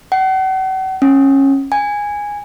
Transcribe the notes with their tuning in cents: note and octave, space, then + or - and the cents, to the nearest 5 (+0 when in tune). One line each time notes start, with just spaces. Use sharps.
F#5 +40
C#4 -20
G#5 -10